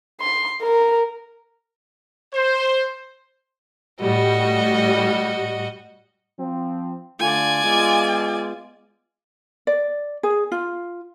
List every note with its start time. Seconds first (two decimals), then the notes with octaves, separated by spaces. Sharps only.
0.21 C6
0.62 A#4
2.34 C5
4.01 A2 G3 F#4 D#5
6.39 F3 C4
7.20 D3 A3 F4 D5 G#5
7.63 G#3 B3 F4
9.67 D5
10.23 G#4
10.52 F4